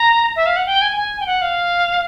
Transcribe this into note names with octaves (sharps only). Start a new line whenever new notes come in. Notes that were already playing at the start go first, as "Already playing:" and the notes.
Already playing: A#5
E5
F5
F#5
G5
G#5
G#5
G5
F#5
F5